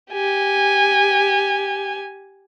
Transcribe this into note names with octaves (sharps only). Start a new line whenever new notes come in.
G4 G#5